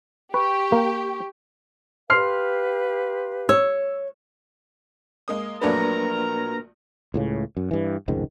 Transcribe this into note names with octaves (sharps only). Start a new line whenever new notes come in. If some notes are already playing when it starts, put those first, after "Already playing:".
G4 B4 C#6
A#3
G4 B4 F5 C6 F6 C7
C#5 E6
G#3 A#3 D#6
A#1 F#3 A3 A#3 D4 A#4 B4 A#5
C#2 A2 C#3
F#2
G2 E3
F1 C#2 G#2 D#3